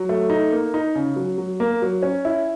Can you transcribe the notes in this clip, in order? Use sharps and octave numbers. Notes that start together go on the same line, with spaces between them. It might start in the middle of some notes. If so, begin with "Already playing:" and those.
Already playing: F#3
A3
D#4
A#3
D#4
C#3
F#3
F#3
A#3
F#3
C#4
E4